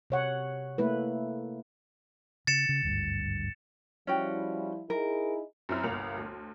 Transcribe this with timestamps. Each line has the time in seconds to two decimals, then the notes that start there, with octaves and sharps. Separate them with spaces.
0.10 C3 C#5 F#5
0.78 A3 A#3 E4 B4
2.47 C#3 A6 C#7 E7
2.69 C#3
2.83 G#1 D2 G2
4.07 F3 G3 C#4 E4 F#4 G5
4.90 D#4 E4 G#4 A#4
5.69 F#2 C4 E4 F6
5.83 G1 C2 A#3 F7
6.18 D2